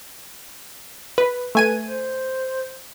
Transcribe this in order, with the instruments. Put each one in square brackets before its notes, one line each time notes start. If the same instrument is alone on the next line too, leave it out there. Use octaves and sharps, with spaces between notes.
[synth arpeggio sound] B4
[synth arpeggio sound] A3 G#5 D#7 [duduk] B4
[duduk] C5